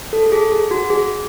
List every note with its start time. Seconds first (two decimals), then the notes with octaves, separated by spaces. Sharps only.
0.13 A4
0.26 A4
0.32 G#4
0.52 G#4
0.71 F#4
0.90 G#4